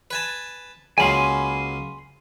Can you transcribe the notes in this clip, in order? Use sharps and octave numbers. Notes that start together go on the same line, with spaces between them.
B4 G#5 A5
C#2 F#3 A#3 G#5 B5 C6